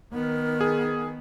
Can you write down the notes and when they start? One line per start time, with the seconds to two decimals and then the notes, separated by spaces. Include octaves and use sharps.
0.13 D#3 B3 A#4
0.61 G#4